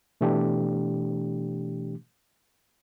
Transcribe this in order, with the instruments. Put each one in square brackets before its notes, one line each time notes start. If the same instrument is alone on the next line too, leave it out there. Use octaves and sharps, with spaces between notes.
[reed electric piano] B2 E3 A3 D4 G4